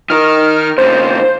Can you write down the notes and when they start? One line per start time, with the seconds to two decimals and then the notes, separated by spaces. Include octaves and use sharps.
0.10 D#3 A#4 F6
0.78 D#2 C#3 C5